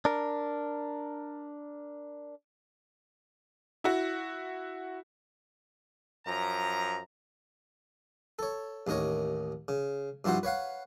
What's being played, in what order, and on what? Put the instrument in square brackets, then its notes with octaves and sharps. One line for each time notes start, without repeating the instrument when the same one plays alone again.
[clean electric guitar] D4 A#4
[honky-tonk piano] E4 F#4
[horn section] F#2 F3 A#5
[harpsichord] A4 C#5
A1 D#2 D#4 A#4 C#5
C#3
G2 F3 E4 F#4 C5 F#5
B4 C#5 F5 F#5